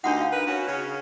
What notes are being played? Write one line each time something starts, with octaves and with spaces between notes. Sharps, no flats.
D2 G2 D4 D#4 F#4 F#5
F5
A#4 B4
C#4 F#4
C#3 C#4